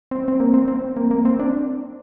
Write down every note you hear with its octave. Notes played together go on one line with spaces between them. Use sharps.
C4
C4
A#3
C4
C4
A#3
A#3
C4
D4